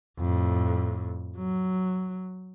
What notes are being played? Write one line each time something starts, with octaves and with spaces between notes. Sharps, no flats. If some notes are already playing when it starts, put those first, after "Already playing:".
F2 A2
F#3